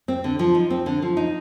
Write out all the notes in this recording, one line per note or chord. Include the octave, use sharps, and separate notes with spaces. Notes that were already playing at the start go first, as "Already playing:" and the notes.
C4
D3
F3
D#4
C4
D3
F3
D#4